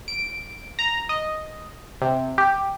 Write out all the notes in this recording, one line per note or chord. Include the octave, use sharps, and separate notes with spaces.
D7
A#5
D#5
C3
G4